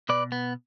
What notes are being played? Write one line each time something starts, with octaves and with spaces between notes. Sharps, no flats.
B2 B4 D5
B3